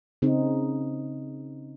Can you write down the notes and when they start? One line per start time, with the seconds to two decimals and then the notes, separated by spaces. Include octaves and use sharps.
0.22 C#3 C4 D#4